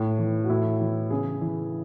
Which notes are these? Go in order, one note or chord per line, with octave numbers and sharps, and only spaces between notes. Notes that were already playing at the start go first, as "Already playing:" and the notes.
Already playing: A2
E3
F#4
A2 E4
E3
C#3 G#4
E3